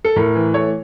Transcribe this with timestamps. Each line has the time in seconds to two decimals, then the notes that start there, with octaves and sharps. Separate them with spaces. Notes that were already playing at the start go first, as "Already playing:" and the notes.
0.05 A4
0.16 A2 A#4
0.35 E3
0.54 A3 C#5